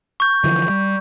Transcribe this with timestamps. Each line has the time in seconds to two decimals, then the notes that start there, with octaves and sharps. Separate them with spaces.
0.20 C#6 G6
0.44 D3 E3 F3
0.69 G3